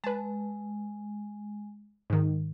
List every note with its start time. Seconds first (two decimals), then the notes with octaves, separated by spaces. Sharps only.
0.04 G#3 B4 A5
2.10 G#2 D#3